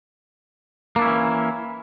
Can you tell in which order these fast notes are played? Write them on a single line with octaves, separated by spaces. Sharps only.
A#3 D4 E4 C#4 E3